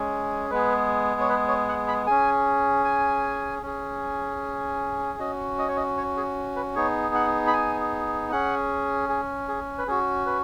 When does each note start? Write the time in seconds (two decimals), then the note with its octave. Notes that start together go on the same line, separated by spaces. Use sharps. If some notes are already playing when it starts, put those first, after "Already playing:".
Already playing: G#3 C#4 G#4
0.50 G#3 B3 G#4 B4
1.21 C#5
1.29 B4
1.48 C#5
1.69 F#5
1.88 B5
2.07 C#4 G#4 G#5
2.85 G#5
3.63 C#4 G#4
5.19 C#4 F#4 D#5
5.58 D#5
5.68 C#5
5.77 D#5
5.97 C#5
6.17 G#4
6.56 B4
6.75 B3 D#4 G#4 C#5
7.15 F#5
7.47 B5
7.53 G#5
8.32 C#4 G#4 F#5
9.09 G#4
9.48 G#4
9.78 B4
9.88 C#4 F#4 G#4
10.26 B4